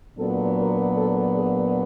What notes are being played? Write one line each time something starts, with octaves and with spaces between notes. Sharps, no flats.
A#2 F#3 B3 D4 A4
A#4
A4
G#4